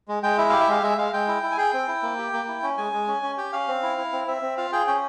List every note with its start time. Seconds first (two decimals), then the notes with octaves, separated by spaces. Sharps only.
0.08 G#3
0.23 G#3 G5
0.38 E4 E5
0.49 G4 F5
0.60 E5
0.68 G#3 F5
0.83 G#3 E5
0.98 G#3 F5
1.13 G#3 G5
1.28 E4
1.43 E4
1.51 G#5
1.58 G#4 G5
1.73 C4
1.88 E4
2.03 A#3
2.18 G4
2.33 A#3
2.48 E4
2.63 C#4
2.78 G#3 G#5
2.93 G#3
3.08 C#4
3.23 C#4
3.38 G4 G5
3.53 C#4 F5
3.68 C4
3.83 E4
3.98 E4
4.13 C4
4.27 C4 E5
4.42 C4
4.57 F4 F5
4.72 G#4 G5
4.87 C#4 G5